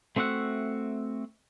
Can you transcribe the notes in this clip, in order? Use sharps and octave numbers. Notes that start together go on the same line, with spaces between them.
A3 C4 F#4 E5 F#5